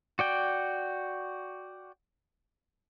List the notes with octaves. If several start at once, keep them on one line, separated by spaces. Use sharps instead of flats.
F#4 D5 G5